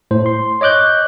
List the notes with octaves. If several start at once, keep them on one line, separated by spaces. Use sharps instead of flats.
A2 C5
C6
C#5 D#5 D6 F#6 G6